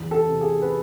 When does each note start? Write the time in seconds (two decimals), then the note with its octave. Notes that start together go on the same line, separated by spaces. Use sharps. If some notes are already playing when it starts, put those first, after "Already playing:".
Already playing: E2
0.11 A4
0.27 C3
0.41 G#4
0.62 B4